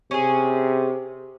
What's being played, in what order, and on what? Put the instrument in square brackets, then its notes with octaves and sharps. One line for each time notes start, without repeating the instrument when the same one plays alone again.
[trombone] C3 [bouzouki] C#4 G#4